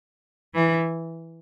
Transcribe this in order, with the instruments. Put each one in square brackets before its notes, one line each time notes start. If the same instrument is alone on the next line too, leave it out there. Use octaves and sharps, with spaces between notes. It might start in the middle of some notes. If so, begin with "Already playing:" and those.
[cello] E3